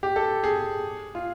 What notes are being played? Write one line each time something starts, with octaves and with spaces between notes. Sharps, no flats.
G4
A4
G#4
F4